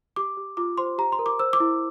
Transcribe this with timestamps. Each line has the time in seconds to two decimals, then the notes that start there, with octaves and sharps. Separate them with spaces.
0.16 G4 D6
0.37 G4
0.57 F4 D6
0.78 C5 C6
0.98 G4 A#5
1.12 C6
1.19 A#4
1.26 D6
1.39 C5 E6
1.53 D6
1.60 E4